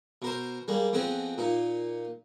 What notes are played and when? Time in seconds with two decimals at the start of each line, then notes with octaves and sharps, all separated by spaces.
0.22 B2 A#4 C5
0.68 G3 G#3 A#3
0.93 F2 B3 C4 G#4 D#5
1.38 A#2 D#4